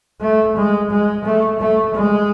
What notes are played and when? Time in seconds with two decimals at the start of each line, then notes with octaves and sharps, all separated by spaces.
0.21 A3
0.56 G#3
0.90 G#3
1.24 A3
1.60 A3
1.94 G#3